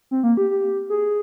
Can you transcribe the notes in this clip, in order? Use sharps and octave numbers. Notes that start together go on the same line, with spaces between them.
C4
A#3
G4
G4
G#4